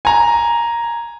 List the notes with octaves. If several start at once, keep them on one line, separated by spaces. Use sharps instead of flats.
G#5 A#5